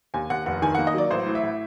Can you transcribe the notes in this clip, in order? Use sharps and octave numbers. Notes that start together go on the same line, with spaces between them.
D#2 G#5
D#2 F#5
F1 F#5
D#3 G#5
A#3 F#5
D#5
F#3 D5
A1 C5
A2
E5
A2